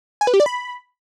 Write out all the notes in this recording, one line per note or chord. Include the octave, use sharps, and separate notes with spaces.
G#5
B4
G4
D5
B5